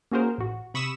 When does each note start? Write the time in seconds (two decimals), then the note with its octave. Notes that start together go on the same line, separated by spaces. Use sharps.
0.11 A#3 C#4 F#4 G#4 A#4 C5
0.38 A1 F#4
0.74 C3 B5 C#6 D#6 E6 E7